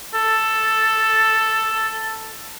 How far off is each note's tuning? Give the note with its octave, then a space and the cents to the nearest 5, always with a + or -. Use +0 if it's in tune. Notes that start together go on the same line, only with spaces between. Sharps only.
A4 +5